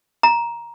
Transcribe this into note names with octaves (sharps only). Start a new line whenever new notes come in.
A#5